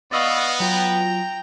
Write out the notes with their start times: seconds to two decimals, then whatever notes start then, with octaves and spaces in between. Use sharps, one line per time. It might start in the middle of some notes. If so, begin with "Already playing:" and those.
0.12 B3 D5 D#5 F5 C#6 E6 A6
0.60 F#3 F4 G5 A#5